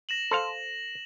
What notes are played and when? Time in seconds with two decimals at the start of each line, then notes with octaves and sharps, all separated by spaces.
0.09 A#6 E7 F#7
0.31 A4 C5 F5